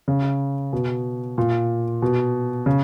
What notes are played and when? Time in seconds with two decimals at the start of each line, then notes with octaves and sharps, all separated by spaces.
0.08 C#3
0.73 B2
1.38 A#2
2.02 B2
2.66 C#3